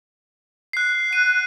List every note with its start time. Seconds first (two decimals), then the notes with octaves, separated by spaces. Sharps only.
0.73 F#6 C7
1.13 F#5 D#7